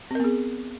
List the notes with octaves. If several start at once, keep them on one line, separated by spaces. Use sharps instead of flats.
B3 C4 G#4 A#4